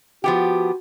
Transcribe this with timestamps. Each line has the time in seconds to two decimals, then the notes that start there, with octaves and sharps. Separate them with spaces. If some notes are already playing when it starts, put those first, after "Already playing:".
0.24 F3 B3 F#4 G4